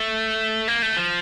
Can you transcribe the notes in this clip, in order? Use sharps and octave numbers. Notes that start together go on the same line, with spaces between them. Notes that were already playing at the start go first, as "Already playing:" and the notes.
Already playing: A3
A#3
A3
F3